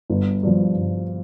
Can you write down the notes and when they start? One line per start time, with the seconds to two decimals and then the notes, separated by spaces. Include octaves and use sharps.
0.10 G1
0.43 G2 F3
0.76 G1